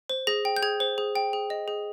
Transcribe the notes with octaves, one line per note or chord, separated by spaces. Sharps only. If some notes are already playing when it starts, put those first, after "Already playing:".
C5
G#4 A#6
G5
G6
G#4 G#6
C5
G#4
G5
G#4
D#5
G#4